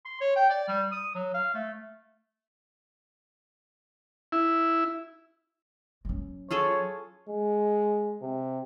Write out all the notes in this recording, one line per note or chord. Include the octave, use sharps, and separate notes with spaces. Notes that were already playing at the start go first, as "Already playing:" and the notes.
C6
C#5
G5
D5
G3
D#6
F#3
F5
A3
E4
F#3 C#4
F4 G#4 A4 C#5
G#3
C3